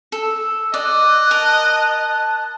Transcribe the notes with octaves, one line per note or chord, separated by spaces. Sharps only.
A4 E6
D5 D#5 F#6
A#4 A5